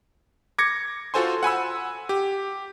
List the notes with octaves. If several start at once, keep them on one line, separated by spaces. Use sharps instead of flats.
D6 G#6 A#6 C#7
F4 F#4 A4 C5 G#5 C6
F#5 G#5 B5 E6
G4